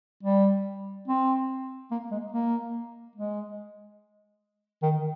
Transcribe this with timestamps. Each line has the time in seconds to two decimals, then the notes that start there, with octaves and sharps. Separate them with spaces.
0.23 G3
1.08 C4
1.91 A#3
2.11 G#3
2.32 A#3
3.16 G#3
4.82 D#3